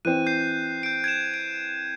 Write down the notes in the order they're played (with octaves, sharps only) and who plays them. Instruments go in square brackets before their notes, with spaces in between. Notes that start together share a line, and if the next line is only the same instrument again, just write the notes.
[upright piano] E3 C4 [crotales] F#6 D#7
[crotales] G6 C7
G6 D7
G#6 D7 E7
D7